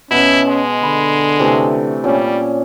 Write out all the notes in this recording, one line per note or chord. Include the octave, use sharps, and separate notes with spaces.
B2 B3 C#4 E4
G#3
D3 B5
C3 E3 A3
A#2 G3 C#4